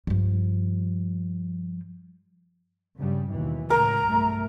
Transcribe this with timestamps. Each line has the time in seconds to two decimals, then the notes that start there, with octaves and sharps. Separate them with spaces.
0.07 G2 F3
2.98 G2 C#3 G3
3.31 D#2 B2 E3
3.70 C#2 A2 A#4 A#5
4.06 B1 G2 A3